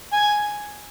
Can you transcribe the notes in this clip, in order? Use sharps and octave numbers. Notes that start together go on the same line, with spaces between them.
G#5